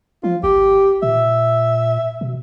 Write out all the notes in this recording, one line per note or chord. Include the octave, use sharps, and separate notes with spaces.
F3 F4
G#1 G4
A#2 E5
B2